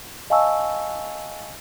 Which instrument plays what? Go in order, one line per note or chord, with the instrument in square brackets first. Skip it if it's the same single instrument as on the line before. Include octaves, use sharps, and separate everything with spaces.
[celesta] D#5 F5 G#5 A5 C#6 E6